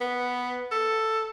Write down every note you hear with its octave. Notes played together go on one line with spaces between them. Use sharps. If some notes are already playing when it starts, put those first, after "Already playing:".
B3
A4